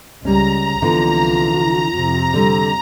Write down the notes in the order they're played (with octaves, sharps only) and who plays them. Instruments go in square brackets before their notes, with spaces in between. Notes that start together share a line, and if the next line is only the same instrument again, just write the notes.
[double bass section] C#2 [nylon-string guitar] G3 C#4 [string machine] A#5
[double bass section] C2 F3 [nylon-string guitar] D3 E3 B3 [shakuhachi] F4
[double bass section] F2 C3
[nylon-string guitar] D3 G3 [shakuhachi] A4